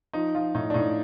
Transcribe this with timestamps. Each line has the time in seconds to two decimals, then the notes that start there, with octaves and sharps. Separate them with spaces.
0.13 F3 D#4
0.35 F3 F4
0.55 A2 D#4
0.70 D4
0.74 A2 D#4